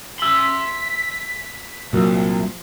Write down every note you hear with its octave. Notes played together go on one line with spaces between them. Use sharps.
E5 C6 E6 B6 F#7
C2 A#2 F3 F#3 A#3